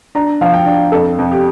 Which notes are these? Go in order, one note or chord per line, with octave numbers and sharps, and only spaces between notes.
D4 A#5
F3 F5
G5
D4
F2 A4
F2
G4